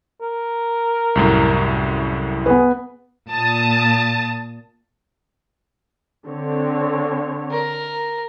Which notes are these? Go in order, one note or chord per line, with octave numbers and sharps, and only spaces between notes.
A#4
C2 F#2 A2
B3 G#4 B4
A#2 A5 D#6
D3 C4 C#5
A#4